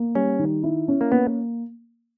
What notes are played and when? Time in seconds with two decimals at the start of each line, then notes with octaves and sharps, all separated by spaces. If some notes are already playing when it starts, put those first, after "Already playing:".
Already playing: A#3
0.15 G3 C#4
0.39 D#3
0.63 E4
0.88 C#4
1.01 A#3
1.12 A#3 B3